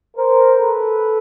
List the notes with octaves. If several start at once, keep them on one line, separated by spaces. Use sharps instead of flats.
A#4 C5
A4 B4